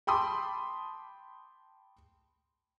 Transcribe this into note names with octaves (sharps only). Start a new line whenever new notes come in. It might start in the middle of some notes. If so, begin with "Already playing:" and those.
G5 A5 B5 C6 D6 D#6